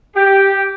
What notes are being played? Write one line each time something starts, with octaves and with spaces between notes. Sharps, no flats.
G4